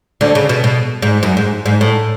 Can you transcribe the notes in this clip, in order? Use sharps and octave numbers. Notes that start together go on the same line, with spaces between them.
D2 D3
C#3
B2
B2
G#2
F#2
G#2
G#2
A2